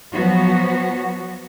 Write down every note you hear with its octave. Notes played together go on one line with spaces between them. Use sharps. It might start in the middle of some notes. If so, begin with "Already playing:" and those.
F3 F#3 B3 F#4